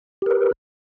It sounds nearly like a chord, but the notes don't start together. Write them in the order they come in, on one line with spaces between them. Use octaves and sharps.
G4 A#4 B4